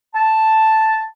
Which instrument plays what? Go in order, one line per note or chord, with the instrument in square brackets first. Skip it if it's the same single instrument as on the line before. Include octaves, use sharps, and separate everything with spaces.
[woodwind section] A5